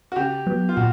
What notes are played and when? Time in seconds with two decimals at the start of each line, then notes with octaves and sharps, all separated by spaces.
0.12 F#4
0.16 C#3 G4
0.46 F#3 B3
0.69 F4
0.77 A#2 F#4